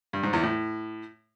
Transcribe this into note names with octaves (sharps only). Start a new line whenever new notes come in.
G2
G#2
E2
A2